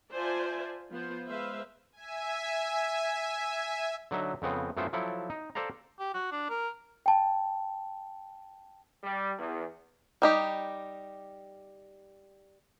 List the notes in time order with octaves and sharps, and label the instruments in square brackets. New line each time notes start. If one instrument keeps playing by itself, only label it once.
[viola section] F4 C5 D5 E5 G#5 A5
F3 B3 F4 C5
G#3 B4 C5 E5 F5
[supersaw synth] E5 G#5
[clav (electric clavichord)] D3 F#3 D#4 E5
F2 C#3 B3 C4
F#2 A3 B3 E4 F4 C5
F3 F#3 E4 A4
D#4
A4 C5 D5 F5 A#5
[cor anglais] G4
F#4
D4
A#4
[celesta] G5 A5
[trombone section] G3
E2
[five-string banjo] G3 D#4 G4